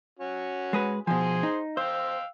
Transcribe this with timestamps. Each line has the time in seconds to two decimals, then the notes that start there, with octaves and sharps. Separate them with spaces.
0.19 C#4 F#4
0.73 G#3 G#4 B4
1.07 B2 F3 G#4 C5 G#5
1.43 D#4
1.77 C5 F5 G5 E6